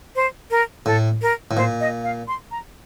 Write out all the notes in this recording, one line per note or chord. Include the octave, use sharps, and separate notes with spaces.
C5
A#4
A2 A4
A#4
A2
A#2 C5
D#5
F5
C6
A#5